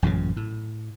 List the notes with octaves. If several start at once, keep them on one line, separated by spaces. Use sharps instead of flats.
A1 F#2 A#2 C#3
A2